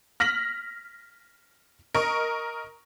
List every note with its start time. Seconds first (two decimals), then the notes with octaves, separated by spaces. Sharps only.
0.20 F6 A#6 B6 F#7
1.95 A#4 D#5 C#6